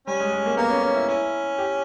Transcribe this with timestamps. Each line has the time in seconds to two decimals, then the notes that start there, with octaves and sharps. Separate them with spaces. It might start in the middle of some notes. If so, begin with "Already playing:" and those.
0.07 G3 C#4
0.20 G#3
0.33 G#3
0.46 A#3
0.57 A#3 B3
0.70 C#4
0.83 C#4
0.95 E4
1.08 C#4 E4
1.58 G4